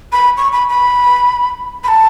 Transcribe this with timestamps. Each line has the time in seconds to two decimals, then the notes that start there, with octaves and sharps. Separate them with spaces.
0.12 B5
0.37 C#6
0.53 B5
0.69 B5
1.84 B5
1.88 A5